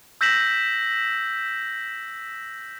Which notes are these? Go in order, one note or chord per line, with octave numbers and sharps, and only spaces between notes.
E6 G6 A#6 B6 E7 F#7